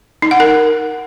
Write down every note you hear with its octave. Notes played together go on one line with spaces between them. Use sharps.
D#4
F#5
A#4